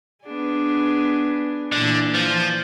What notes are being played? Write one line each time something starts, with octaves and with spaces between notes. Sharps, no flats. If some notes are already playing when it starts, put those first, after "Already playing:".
B3 D4 G#4
A#2 D3 E3
F3 F4